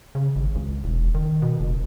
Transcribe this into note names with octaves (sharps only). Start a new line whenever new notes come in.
C#3
G#1
C#2
E1
D#3
B2
F1